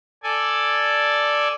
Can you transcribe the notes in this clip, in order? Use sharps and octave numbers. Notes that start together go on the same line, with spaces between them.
A4 D5 G#5